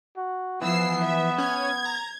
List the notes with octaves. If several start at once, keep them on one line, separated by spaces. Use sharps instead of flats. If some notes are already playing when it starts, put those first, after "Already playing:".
F#4
E3 F3 B3 E6 C7
E5
C#4 G#6
A#5